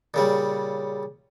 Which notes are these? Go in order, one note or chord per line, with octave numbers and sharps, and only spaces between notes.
A#2 C#3 G3